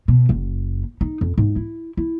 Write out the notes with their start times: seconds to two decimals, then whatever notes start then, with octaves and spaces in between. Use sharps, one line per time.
0.08 B2
0.29 F#1
1.01 D#4
1.21 F2
1.38 G#2
1.56 E4
1.97 E4